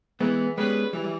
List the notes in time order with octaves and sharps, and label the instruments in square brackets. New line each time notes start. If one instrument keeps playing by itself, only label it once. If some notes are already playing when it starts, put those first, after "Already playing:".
[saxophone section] E3 [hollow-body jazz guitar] G#3 B3
[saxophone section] G3 C#4 G#4 B4 [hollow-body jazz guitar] G#3 B3
[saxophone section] E3 [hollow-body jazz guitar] G3
[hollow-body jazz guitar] G3